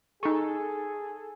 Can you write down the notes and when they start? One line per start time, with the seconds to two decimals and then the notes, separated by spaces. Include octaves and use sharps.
0.23 D#4 G#4 A4 C#6